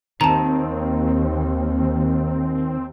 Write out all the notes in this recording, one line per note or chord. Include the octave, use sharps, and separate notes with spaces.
D#2 D#3 C4 A5 A#5